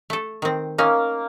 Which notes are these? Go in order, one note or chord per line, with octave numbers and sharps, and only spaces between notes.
A3 A4
D#3 C4
A#3 C#4 D#4